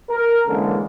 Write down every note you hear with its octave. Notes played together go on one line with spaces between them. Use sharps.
A#4
D3 E3 G#3 A#3 C#4 A4